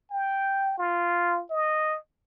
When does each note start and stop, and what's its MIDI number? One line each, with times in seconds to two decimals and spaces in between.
0.10 0.75 79
0.78 1.42 65
1.50 1.97 75